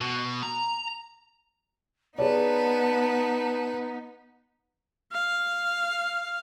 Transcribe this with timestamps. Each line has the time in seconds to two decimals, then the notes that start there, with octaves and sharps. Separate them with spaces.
0.01 B2
0.43 A#5
2.18 B3 D#4 G#4 B4 C#5 D5 A5
5.13 F5